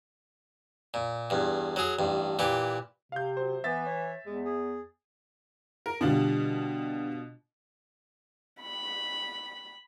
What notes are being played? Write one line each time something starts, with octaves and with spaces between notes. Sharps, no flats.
A#2
E2 G2
F#3 G#4
A1 G2
A#2 E3 G4
C3 F5 G6
F#3 C5
E3 B3 E5 A6
C#5
E2 G#3
G#4
A#4
B2 D3 G3 D4 F4
B5